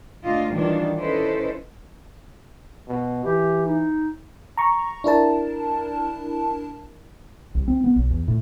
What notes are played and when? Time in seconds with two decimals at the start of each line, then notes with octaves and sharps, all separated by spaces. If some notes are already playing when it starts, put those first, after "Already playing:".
0.22 D2 D4 F4 D#5
0.52 D#3 E3 F#3 G3 D4 F4
0.98 C#4 E4 A4 B4 C5 D#5
2.88 B2
3.25 E3 G4
3.66 D#4
4.57 A#5 C#6
5.04 D4 E4 A#4 A5
7.55 C2
7.68 C4
7.84 B3
7.96 B1
8.11 E2
8.28 A2